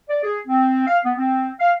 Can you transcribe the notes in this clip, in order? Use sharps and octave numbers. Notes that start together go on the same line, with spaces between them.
D5
G#4
C4
F5
B3
C4
F5